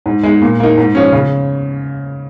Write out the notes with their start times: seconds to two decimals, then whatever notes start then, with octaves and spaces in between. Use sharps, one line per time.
0.06 G#2
0.23 G#3 D#4
0.42 A#2
0.60 A#3 D#4
0.78 G#2
0.95 F3 C#4
1.12 C#3